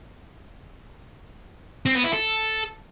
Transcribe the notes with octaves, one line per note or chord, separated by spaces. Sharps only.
C4
B3
E4
A4